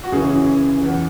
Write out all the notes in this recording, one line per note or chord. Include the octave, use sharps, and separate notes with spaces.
F#4
F#2 C#3 E3 G#4
E2 E3